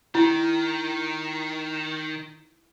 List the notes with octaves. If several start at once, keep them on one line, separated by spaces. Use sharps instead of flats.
D#3 E4